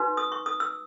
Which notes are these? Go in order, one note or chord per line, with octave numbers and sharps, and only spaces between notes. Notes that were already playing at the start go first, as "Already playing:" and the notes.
Already playing: D#4 F#4 B4
D#6
C#6
D#6
E6